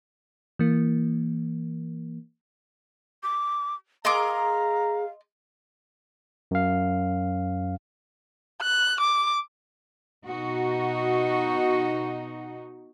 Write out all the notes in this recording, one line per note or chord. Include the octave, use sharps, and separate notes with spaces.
E3 A#3
D6
G#4 A#4 D#5 F5 A#5 C6 D6
F#2 F5
F#6
D6
B2 D#4 F#4